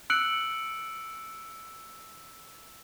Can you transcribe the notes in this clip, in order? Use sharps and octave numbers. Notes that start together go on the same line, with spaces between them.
E6 F#6 C#7 D7 F#7